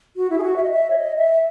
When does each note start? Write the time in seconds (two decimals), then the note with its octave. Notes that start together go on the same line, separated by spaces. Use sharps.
0.16 F#4
0.30 E4
0.38 G#4
0.43 F#4
0.56 E5
0.63 D#5
0.71 E5
0.90 C#5
0.96 D#5
1.16 E5